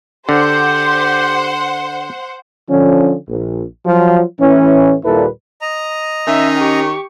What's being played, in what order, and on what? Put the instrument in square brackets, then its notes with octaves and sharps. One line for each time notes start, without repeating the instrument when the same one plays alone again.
[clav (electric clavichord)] D3 [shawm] G4 [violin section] C5 F#5 C6
[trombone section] D3 F3 C#4
A#1
F3 F#3 F4
A2 E3 C#4
D#2 A#2 G3 E4 A4 B4
[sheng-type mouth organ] D#5 A#5
[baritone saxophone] D#3 [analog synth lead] C#4 [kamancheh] E5
[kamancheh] G4 C#6